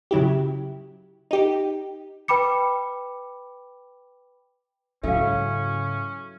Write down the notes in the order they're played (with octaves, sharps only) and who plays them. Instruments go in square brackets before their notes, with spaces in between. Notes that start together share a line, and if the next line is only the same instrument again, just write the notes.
[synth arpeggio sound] C#3 F#3 E4 G4
D#4 G4
[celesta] B4 G5 B5 D6 C#7
[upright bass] G#2 C#3 [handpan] F#3 E4 E5 [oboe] C#4 [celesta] A4 F5